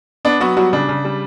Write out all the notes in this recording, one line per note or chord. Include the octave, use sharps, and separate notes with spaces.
B3 D4
F#3 B3 F#4
F#3 G3 F#4
C#3 D4
C#3
G3